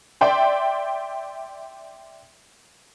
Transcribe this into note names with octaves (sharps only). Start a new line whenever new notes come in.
D5 E5 G5 C6